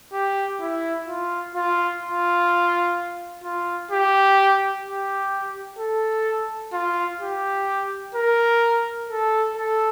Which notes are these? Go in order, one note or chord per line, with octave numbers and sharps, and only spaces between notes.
G4
E4
F4
F4
F4
F4
G4
G4
A4
F4
G4
A#4
A4
A4